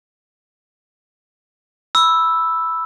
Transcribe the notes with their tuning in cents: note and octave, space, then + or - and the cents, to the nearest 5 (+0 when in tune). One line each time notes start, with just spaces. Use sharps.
B5 +0 E6 +0